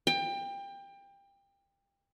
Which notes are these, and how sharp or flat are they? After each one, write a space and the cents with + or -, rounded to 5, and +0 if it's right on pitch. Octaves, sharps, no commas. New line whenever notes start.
G5 +25